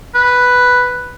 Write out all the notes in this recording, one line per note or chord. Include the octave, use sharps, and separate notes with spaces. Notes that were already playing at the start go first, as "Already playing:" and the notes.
B4